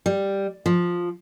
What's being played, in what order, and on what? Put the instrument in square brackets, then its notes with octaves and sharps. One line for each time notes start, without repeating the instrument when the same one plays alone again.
[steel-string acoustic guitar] G3
F3